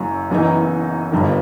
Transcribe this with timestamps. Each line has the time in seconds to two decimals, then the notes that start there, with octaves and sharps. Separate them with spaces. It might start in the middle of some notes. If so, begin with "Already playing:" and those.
Already playing: F#1 F#2 F#3
0.30 F#1 F#2 E3 B3 D#4
1.12 G1 G2 D#3